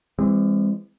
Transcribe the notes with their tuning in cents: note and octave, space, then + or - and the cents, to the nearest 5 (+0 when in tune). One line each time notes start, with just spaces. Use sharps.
E3 +10 G#3 -45 C4 +0